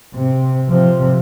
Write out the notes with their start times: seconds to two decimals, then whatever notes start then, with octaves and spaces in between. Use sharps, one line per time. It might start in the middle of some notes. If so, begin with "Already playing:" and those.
0.14 C3
0.69 C3 F3